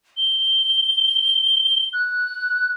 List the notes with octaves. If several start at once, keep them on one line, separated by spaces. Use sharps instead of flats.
G7
F#6